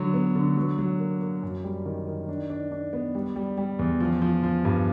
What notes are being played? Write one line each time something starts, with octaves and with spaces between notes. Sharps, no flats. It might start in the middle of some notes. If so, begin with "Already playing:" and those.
Already playing: D3 F#3
B3
D3
F#3
F#3
A#3
A#3
F#2
G3
D#3
D#3
D4
D4
D4
B3
G3
G3
G3
E2
F3
F3
F3
G2